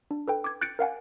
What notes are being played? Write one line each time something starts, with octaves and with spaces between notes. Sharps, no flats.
D4
A4 B4 G5
D6 G#6
F#6 G6 A6 C#7 D7
A#4 F5 F#5 G#5